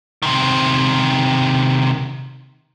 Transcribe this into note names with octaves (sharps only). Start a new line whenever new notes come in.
C3 D#3